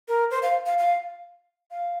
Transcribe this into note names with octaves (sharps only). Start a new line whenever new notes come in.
A#4
C5
F5
F5
F5
F5